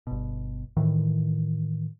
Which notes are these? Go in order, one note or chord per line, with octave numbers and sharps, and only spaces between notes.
G1 B2
A2 D#3 E3